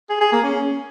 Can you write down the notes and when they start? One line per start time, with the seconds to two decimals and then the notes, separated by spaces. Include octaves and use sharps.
0.10 G#4
0.21 G#4
0.33 A#3
0.44 C#4